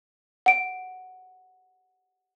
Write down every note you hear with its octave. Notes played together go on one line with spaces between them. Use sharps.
F#5 D7